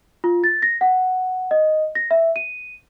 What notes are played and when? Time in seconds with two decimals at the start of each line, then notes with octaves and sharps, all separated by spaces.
0.24 F4
0.44 A6
0.62 A#6
0.81 F#5
1.51 D#5
1.95 A#6
2.11 E5
2.36 D#7